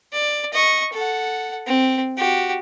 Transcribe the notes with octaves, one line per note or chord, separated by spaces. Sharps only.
D5
D#5 C#6
A4 F#5
C4
F#4 G4